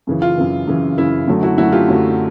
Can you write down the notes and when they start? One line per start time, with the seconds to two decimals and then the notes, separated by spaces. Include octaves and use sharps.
0.07 F#2 C#3 E3
0.22 F4
0.38 F#2 C#3 E3
0.67 F#2 C#3 E3
0.97 F#2 C#3 E3 E4
1.27 F#2 D3 F#3 A3
1.43 E4 F#4
1.58 F#2 D3 F#3 A3 E4 F#4
1.72 F4 G4
1.88 F#2 D3 F#3 A3